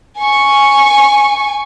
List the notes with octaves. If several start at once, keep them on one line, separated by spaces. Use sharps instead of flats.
G#5 C#6